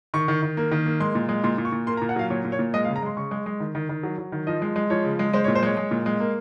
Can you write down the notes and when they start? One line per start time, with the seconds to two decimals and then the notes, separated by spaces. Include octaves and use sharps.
0.14 D#3 C#6
0.28 D#3
0.43 D#3
0.57 A#3
0.72 D#3
0.86 A#3
1.00 G#3 C6
1.15 A#2
1.29 G#3
1.44 A#2 C6
1.58 A#2
1.65 C#6
1.72 A#2
1.87 A#3 C6
1.97 A#5
2.02 A#2
2.09 F#5
2.16 F#3 F5
2.30 A#2 C#5
2.45 A#2
2.52 C#5
2.59 A#2
2.74 G#3 D#5
2.85 F5
2.88 C#3
2.96 A#5
3.03 G#3 C6
3.17 C#3 C#6
3.31 G#3
3.46 G#3
3.60 D#3
3.75 D#3
3.89 D#3
4.03 F#3
4.18 F#3
4.32 D#3
4.47 F3 D#5
4.62 G#3
4.76 G#3
4.90 F3 C#5
5.05 C#3
5.19 G#3
5.33 G#3 C5
5.44 C#5
5.48 A#2
5.55 C5
5.63 G#3 C#5
5.77 G#3
5.91 A#2
6.06 G#3
6.20 A#3